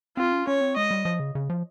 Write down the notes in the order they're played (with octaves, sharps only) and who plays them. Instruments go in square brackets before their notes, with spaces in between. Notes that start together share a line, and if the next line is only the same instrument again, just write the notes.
[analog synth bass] C4 [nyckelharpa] F4
[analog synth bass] C#4
[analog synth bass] C#4 [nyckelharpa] C#5
[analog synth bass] C4
[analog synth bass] G#3 [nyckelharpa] D#5
[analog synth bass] G3
F3
C#3
C#3
F3